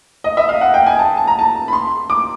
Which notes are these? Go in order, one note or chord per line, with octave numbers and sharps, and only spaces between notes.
D#5
E5
F5
F#5
G5
G#5
A5
A5
A#5
A5
B5
C6
D6